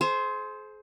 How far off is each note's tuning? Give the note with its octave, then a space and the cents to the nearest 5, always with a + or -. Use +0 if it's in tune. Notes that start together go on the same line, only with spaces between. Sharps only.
G#4 +40 C5 +0 C#6 -15